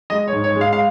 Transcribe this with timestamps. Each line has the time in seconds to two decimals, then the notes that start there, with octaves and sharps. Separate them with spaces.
0.10 G#3 D#5
0.28 C#5
0.32 G#2
0.44 C#5
0.55 G#3
0.61 F5
0.73 F5